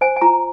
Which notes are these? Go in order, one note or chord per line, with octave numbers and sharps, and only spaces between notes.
C5 G#5
G#5
F4 A#5